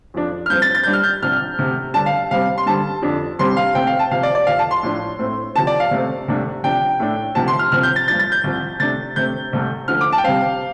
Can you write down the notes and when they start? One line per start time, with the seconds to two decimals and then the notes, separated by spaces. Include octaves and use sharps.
0.14 F2 F3 D4
0.46 F6
0.50 G2 F3 C4 G6
0.62 A6
0.75 A6
0.83 G2 G3 D4 G6
0.93 F6
1.04 G6
1.22 C2 C3 F3 D4 F6
1.59 D2 C3 A3
1.94 G2 D3 G3 D4 A5
2.06 F5
2.31 C3 G3 C4 F5
2.58 C6
2.66 G2 D3 G3 A5
3.02 F2 D3 F3 D4
3.39 C2 C3 G3 C4 C6
3.57 F5
3.75 C3 A3 C4 G5
3.87 F5
3.99 A5
4.11 C3 F3 C4 F5
4.23 D5
4.35 D5
4.47 F2 C3 F3 F5
4.59 A5
4.71 C6
4.83 A2 F3 D4
5.19 A2 A3 C4
5.55 D2 C3 F3 A5
5.67 D5
5.80 F5
5.91 C3 A3 C4
6.28 C2 C3 A3 D4
6.63 C3 F3 D4 G5
7.00 A2 A3 D4
7.35 D2 C3 F3 A5
7.48 C6
7.59 F6
7.72 C2 C3 F3 C4 F6
7.83 G6
7.96 A6
8.08 G2 F3 D4 A6
8.19 A6
8.32 G6
8.44 C2 C3 F3
8.80 C3 A3 D4 A6
9.16 C3 A3 C4 G6
9.53 C2 C3 A3
9.88 D2 D3 F3 F6
10.01 D6
10.13 A5
10.18 G5
10.24 C3 G3 C4 F5